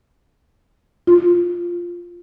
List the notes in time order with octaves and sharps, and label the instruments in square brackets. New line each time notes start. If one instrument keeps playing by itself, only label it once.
[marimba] F4